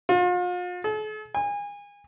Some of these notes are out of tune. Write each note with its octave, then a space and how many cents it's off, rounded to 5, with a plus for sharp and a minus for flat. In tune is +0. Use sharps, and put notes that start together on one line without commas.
F4 +40
A4 -45
G#5 -30